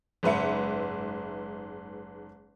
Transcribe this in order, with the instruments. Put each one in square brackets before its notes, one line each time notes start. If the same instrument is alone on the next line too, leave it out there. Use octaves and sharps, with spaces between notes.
[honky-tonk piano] F#1 G#2 B4 E5 C#7